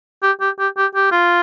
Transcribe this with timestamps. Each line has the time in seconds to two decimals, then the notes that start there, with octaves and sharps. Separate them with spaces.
0.22 G4
0.41 G4
0.59 G4
0.77 G4
0.95 G4
1.11 F4